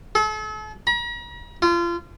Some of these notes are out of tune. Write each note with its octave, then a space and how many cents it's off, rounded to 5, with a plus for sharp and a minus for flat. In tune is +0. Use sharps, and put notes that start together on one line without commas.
A4 -40
A#5 +45
F4 -30